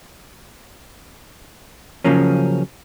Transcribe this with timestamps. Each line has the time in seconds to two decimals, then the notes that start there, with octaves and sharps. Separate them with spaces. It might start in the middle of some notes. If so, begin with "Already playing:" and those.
2.04 C#3 F3 F#3 A#3 C#4